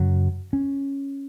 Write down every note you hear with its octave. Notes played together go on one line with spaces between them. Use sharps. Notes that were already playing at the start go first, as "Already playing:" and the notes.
Already playing: F#2 C#3 F#3
C#4